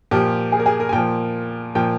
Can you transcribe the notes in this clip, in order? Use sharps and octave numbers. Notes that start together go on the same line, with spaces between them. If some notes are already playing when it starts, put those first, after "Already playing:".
A#2 F3 G4
G#4
A#4
G#4
A#4
G#5
A#2 F3 G5
A#2 F3 G5